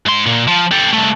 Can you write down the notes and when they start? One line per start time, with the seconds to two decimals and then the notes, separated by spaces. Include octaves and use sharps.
0.06 G#2 C6
0.26 A#2
0.48 F3
0.71 G4 A4
0.93 C2 A3